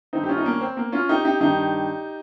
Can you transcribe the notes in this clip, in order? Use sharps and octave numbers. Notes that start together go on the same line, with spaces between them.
G2 D#3 C4 D#4
G4
C#4 F4
D#4
A#3 C#4
C4
A#3
C#4 F4
D#4 G4
D#4 G4
G2 D#3 D#4 G4